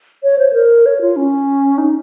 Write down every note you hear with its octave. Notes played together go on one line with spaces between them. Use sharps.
C#5
C5
A#4
C#5
F4
C#4
D#4